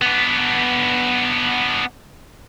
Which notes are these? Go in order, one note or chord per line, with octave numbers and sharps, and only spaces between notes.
B3 D4